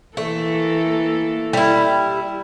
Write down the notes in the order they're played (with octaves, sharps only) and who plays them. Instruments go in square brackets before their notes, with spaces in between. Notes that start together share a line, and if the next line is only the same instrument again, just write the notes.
[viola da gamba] E3 A#3 A4 [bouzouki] A3
[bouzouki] G3 E4